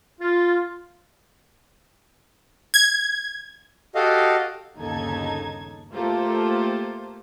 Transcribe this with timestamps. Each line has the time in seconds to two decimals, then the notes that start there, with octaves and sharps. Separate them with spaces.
0.21 F4
2.74 G#6
3.95 F#4 G4 A4 D#5 F5
4.77 G1 D#2 C#3 D#4 A4 G#6
5.93 A3 A#3 F4 G4 A4 C5